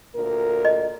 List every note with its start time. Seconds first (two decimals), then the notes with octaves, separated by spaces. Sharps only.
0.15 D2 A#2 A#4
0.65 D#5